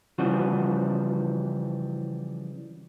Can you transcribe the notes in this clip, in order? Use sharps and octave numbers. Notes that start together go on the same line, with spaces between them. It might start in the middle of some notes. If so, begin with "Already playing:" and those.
C#3 E3 F3 G3 F#4